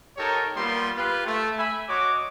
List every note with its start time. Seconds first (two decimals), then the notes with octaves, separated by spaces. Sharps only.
0.17 D#4 G4 A4 A#4 C#5
0.56 G3 A#3 B3 F4 C6
0.97 F4 G4 B4
1.26 A3
1.59 E5 G#5 B5
1.89 F#4 C#5 D#5 D6